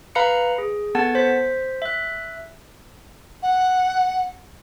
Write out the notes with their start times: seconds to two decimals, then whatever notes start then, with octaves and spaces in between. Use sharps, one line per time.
0.15 B4 F5 A#5 B5 F6 C#7
0.58 G#4
0.95 B3 A4 F#5 A5 G#6 A6
1.15 C5 B6
1.82 E5 F#6
3.42 F#5